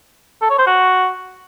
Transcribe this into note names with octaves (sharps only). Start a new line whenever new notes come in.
A4
C#5
C5
F#4